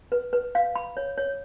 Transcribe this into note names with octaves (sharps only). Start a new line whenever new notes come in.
B4
B4
F5
B5
C#5
C#5